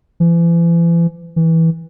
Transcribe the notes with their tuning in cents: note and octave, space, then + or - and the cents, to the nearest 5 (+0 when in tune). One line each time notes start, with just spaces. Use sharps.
E3 +40
E3 -15